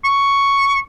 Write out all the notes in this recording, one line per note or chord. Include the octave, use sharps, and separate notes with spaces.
C#6